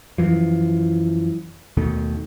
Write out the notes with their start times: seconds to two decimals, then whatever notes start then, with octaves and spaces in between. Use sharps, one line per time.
0.18 F#2 E3 F3
1.77 D#2 B2 D#3 A3